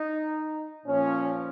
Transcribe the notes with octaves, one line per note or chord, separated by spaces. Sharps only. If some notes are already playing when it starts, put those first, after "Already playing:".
Already playing: D#4
A#2 F3 C#4